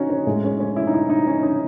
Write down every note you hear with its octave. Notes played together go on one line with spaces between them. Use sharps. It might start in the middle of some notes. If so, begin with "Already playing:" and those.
Already playing: C#4 D#4 F#4
C#4
A2 G#3
C#4
C#4
E4
D#4
E4
D#4
C#4
D#4